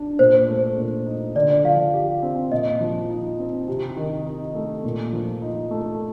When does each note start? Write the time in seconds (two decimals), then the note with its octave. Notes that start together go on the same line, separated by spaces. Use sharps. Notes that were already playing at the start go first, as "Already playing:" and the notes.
Already playing: D4
0.19 A#2 C5
0.48 A3
0.78 A#2
1.06 D#4
1.35 D3 D5
1.64 F3 F5
1.93 G4
2.23 C4
2.51 A#2 D#5
2.80 F3
3.10 D#4
3.39 C4
3.68 C3
3.97 D#3
4.26 D#4
4.55 A3
4.84 A#2
5.13 F3
5.42 D#4
5.71 A3